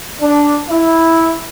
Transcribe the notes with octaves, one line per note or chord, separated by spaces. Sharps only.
D4
E4